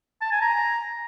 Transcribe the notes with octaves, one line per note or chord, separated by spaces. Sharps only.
A5
G#5
A#5